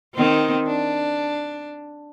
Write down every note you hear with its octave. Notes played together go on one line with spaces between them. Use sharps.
D#3 C4
D4